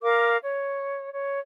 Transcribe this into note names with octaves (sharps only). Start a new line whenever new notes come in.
A#4 F5 D6
C#5
C#5